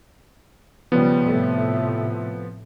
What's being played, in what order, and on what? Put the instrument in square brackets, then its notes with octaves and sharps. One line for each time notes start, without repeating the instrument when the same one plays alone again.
[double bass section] C#3 G3 [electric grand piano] F3 B3
[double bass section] A2 C3 A3